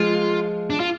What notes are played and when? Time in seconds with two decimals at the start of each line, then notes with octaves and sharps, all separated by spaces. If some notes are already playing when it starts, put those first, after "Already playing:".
Already playing: F3 G#3 F4
0.70 D4
0.80 F4